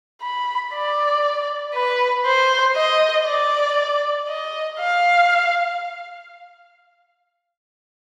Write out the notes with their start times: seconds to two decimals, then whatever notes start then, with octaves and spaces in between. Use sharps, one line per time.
0.22 B5
0.73 D5
1.74 B4
2.25 C5
2.76 D#5
3.26 D5
4.28 D#5
4.79 F5